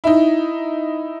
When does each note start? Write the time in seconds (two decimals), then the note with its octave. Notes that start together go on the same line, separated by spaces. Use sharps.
0.04 D#4 E4